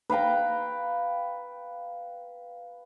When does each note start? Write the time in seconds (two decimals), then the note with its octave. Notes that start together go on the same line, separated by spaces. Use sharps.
0.10 B4 F5 G5 A#5